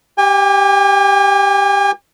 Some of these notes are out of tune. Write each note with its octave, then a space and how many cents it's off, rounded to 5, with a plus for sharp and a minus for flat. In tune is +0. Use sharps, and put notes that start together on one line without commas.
G4 +0 G#5 -45